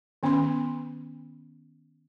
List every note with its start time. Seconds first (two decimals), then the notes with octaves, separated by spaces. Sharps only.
0.23 D#3 B3 C#4 B5 C6